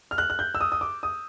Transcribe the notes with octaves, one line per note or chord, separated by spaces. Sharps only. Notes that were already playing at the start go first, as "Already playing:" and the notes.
F6
F#6
F#6
G6
E6
D#6
D#6
D6
D#6